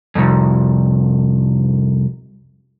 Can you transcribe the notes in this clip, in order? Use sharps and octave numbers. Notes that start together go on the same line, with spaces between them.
C2 F2